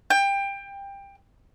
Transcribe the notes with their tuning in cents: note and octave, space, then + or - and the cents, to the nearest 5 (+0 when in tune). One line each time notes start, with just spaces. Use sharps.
G5 +20